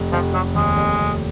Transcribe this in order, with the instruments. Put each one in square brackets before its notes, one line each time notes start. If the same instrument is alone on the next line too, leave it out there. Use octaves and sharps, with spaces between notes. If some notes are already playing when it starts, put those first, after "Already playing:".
Already playing: [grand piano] F1
[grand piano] F1 [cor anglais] F3
[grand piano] F1 [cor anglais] F#3
[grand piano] D#2 [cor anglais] G#3
[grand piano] F1
F1